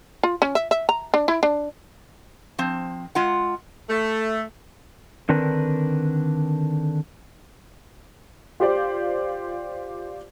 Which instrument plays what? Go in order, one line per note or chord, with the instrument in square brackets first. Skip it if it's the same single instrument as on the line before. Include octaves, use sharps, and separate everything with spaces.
[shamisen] F4
C#4
E5
E5
A#5
D4
E4
D4
[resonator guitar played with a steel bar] F3 C4
G#3 F4 F#5
[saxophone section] A3
[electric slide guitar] D3 D#3 C4 D4 A#4 B4
[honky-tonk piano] F4 G4 C5 D5